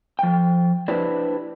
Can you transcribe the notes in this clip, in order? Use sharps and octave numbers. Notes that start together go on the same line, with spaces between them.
F3 G5
D4 E4 G4 B4 C5 D5